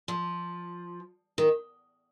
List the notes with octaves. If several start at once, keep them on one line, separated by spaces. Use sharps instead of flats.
F3
D#3